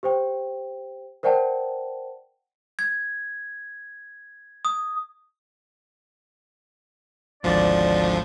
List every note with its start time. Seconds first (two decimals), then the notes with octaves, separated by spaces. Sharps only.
0.03 G4 C5 G5
1.23 A#4 C5 D5 F#5 G5 A5
2.79 G#6
4.65 D#6
7.43 G#1 D2 F3 D5